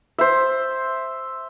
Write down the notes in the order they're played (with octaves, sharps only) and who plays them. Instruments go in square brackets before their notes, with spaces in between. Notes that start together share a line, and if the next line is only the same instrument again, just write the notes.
[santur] C5 E5